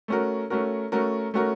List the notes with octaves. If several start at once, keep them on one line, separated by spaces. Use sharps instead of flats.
A3 C#4 F#4 A#4
A3 C#4 F#4 A#4
A3 C#4 F#4 A#4
A3 C#4 F#4 A#4